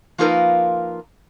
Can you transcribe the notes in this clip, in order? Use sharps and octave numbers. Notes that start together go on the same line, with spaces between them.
F3 A#3 D#4 F4 A#4 B4